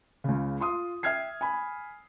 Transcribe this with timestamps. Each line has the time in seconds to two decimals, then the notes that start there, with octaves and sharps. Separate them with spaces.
0.24 C#2 C#3
0.60 F4 C6 D#6
1.03 E5 G5 F6 G#6 C7
1.41 G#5 B5